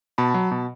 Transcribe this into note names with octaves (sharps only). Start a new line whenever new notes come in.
B2 A5 B5
F#3
B2